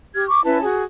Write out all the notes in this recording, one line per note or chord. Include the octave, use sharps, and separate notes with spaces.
G4 F6 G#6
C#6 D6
C#4 E4 B4 A5
F#4 G#4